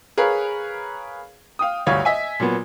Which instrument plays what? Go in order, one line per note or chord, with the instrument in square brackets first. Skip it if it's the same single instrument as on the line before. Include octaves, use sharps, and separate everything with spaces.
[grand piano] G#4 A#4 B4 C#5 F5
F5 G5 D#6
G1 D2 G3 C#5 F5 G#6
D#5 E5 G#5
A#2 F#3 B3